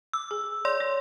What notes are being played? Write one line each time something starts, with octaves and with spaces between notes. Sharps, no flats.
D6 E6
G#4
C#5 D5 C6
C#5